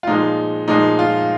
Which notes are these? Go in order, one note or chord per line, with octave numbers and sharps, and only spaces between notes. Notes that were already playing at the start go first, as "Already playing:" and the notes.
F4
A#2 F3 G#3 D#4
A#2 F3 G#3 D#4
F4